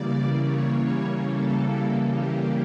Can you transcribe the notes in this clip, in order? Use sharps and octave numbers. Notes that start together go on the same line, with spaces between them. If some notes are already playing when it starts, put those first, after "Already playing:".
Already playing: C#3 E3 G3 A#3 D5
C#5
A4
G4